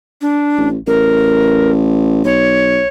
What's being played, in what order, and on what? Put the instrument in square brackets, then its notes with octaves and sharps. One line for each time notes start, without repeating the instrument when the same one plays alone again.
[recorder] D4
[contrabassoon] A1
[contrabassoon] A1 [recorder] A#4
[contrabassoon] B1 [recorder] C#5